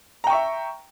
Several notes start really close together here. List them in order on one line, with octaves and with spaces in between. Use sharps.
A#5 G5 C#6 E5